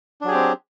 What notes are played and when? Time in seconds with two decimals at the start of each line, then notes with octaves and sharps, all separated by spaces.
0.21 D4
0.25 F#3
0.28 G#4
0.31 G4
0.34 C4